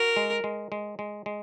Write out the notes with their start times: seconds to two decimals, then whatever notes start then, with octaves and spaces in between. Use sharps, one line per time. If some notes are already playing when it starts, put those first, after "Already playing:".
Already playing: F#4 A#4
0.17 G#3
0.44 G#3
0.72 G#3
0.99 G#3
1.26 G#3